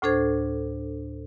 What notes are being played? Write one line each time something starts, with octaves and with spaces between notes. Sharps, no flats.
D2 A2 D4 A4 C5 G#6